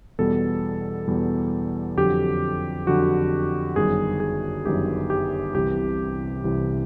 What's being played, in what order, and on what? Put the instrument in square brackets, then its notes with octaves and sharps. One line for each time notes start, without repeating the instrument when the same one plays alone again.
[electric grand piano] E2 B2 G3 A4
E2 B2 G3
F2 D3 F#3 G4
F2 D3 F#3 F#4
G1 F#2 D#3 G3 G#4
G#4
G1 F#2 D#3 G3 G4
G4
C2 C3 E3 G4
C2 C3 E3